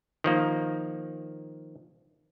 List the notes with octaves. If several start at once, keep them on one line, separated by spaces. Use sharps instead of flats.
D#3 F3 A#3